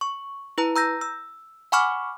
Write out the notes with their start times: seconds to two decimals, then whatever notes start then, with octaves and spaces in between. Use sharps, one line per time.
0.01 C#6
0.58 E4 B4 A#5
0.76 A#5 E6 G6 A#6
1.01 E6
1.72 F#5 G#5 B5 C#6 D6 F6